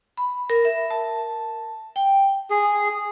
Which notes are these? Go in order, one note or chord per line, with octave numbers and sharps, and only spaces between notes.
B5
A#4
E5
A5
G5
G#4